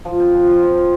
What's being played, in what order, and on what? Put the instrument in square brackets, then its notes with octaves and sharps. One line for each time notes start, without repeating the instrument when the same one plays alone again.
[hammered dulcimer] F3
C4
F3
F4
F3
C4